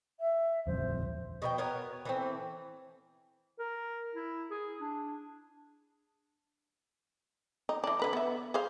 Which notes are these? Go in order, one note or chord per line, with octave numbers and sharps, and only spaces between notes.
E5
D#1 A#1 F2 C5
B2 A#4 G5
B3 A#4 C#5
E3 A3 C4
A#4
E4
G#4
D4
D#4
E3 D4
D3 B4 A#5
B3 E5
G#4 C5 F5